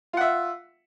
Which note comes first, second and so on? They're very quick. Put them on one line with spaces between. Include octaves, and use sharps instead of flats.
F4 F#5 E5